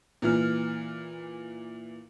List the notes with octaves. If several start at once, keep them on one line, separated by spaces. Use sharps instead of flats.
A#2 E3 F6